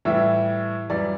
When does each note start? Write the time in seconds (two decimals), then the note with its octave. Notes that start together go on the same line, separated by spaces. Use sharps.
0.05 A2 E3 G3 E5
0.90 F#2 E3 G3 D5